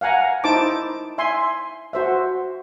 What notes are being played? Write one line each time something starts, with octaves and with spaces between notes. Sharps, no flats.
F5 F#5 G#5 A#5
D#4 E4 C5 A5 D6
E5 G#5 C6
F#4 C5 E5